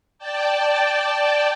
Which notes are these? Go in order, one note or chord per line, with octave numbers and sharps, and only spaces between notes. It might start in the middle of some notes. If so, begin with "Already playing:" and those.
D5 G5 A5